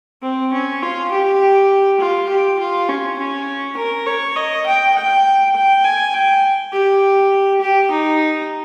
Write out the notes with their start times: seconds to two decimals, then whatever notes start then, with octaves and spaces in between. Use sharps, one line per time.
0.23 C4
0.53 C#4
0.83 F4
1.11 G4
2.00 F4
2.30 G4
2.60 F4
2.89 C#4
3.18 C#4
3.77 A#4
4.07 C#5
4.36 D#5
4.67 G5
4.95 G5
5.55 G5
5.84 G#5
6.14 G5
6.73 G4
7.61 G4
7.91 D#4